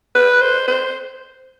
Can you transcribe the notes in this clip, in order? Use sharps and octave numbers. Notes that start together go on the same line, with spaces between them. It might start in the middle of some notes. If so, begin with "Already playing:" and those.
B4
C5
C5